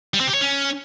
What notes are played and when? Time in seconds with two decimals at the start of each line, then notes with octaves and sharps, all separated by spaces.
0.14 G3
0.21 C4
0.27 G4
0.34 C#5
0.41 C#4